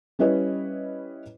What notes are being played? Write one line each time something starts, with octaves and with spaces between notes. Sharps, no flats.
G3 C#4 E4 B4 C#5 D#5